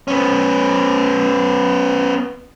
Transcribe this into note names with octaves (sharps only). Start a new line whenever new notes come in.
B3 C#4